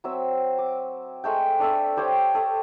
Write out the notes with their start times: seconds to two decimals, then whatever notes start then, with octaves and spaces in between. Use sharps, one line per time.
0.04 F#3 C4 E5
0.59 D6
1.24 G#3 A3 G5
1.59 D4 A4 E5
1.97 G4 C5 C#5 G5
2.35 A4 D#6